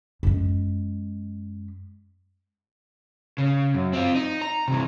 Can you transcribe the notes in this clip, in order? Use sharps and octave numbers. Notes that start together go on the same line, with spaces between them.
F#2 G#3
C#3
F#2
C4 F4
D#4
A#5
C3 E3